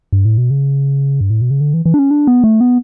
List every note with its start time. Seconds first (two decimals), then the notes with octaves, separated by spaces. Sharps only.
0.13 G2
0.25 A2
0.37 B2
0.50 C#3
1.21 G2
1.30 A2
1.41 B2
1.51 C#3
1.61 D3
1.74 E3
1.86 E3
1.94 D4
1.99 C#4
2.11 D4
2.27 B3
2.44 A3
2.61 B3